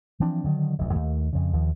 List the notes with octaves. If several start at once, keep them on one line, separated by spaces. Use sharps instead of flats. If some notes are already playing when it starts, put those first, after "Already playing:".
E3 F3 C4 D4
D3 D#3 F#3
F1 D2 F#3
D#2 A3
F2 C#3
D#2 F3